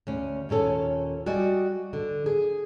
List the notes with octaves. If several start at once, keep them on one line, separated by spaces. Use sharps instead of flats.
D2 C#4
D#2 A#2 C#4 A4 C#5
G3 F#4 D5 D#5 G#5
D3
G#4